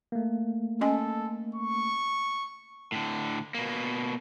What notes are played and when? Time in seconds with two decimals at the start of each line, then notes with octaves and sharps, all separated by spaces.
0.12 A3 A#3
0.81 C#4 A4 D#5 G#5
1.55 C#6
2.92 A2 D3
3.55 B2 A#3